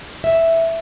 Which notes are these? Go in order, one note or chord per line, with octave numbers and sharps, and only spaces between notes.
E5